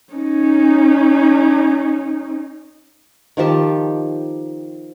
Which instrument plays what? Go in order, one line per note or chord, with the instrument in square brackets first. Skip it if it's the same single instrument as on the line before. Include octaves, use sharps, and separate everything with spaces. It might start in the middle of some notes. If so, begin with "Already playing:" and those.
[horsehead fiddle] C#4 D#4
[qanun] D#3 F3 G4 A5